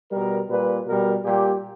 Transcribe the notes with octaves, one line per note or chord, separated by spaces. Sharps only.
B2 G3 A#4
A#2 G3 B4
B2 G3 A#4
A#2 G3 G4